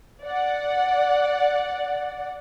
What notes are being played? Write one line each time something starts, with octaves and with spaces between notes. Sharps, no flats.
D5 F#5